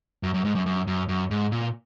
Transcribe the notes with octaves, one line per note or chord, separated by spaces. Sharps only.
F#2
F#2
G#2
F#2
F#2
F#2
F#2
G#2
A#2